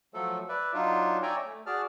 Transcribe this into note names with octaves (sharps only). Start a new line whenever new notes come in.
F3 F#3 A3 A4
B4 D5 E5
F#3 D4 D#4 F4
C#5 D5 E5 G5 G#5 A#5
A3
F#4 G#4 D5 A5 F6